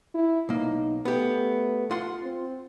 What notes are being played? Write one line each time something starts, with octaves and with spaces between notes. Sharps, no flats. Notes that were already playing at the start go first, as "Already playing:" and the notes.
E4
B1 A#3 D#4
A3 B3 G4
F4 F#5 C6
C4